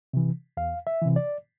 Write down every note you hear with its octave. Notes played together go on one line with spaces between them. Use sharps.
C3 E3
E2 F5
E5
C3 E3
D5